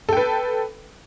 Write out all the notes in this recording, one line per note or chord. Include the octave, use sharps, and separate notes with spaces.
A4 B4 G5